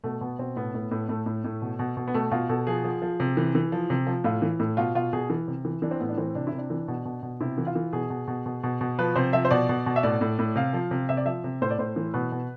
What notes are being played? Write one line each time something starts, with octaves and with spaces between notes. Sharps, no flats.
B2 A3
B2 B3
B2 C4
A2 B3
A2
A2
A2 A3
A2
A2
B2
B2
B2
B3
B2 A3
B2 F4
B2 A4
F3 G#4
F3
F3
C3
E3
E3
F3
C3
F3
A2 F4
E3
A2
B2 F4
B2 F4
B2 G#4
E3
C3
E3
E3 D4
C4
A2 B3
D4
E3 C4
C3 D4
E4
C3
D4
E3
B2
B2
B2
C3 E4
E3
F4
E3
B2 G#4
B2
B2
B2
B2
B2
F3 B4
C3 C5
F3 E5
C5
B2 D5
B2
B2
E5
A2 D5
A2
A2
C3 F5
F3
C3
C3 E5
D5
F3 E5
C3
A2 C5
D5
A2 C5
E3
B2 B4
B2